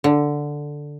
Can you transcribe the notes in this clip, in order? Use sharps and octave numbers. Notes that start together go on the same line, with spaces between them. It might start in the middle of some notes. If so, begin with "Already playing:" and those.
D3